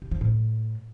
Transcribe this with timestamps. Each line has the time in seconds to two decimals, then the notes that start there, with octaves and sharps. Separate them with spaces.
0.02 C3
0.11 F3
0.21 A2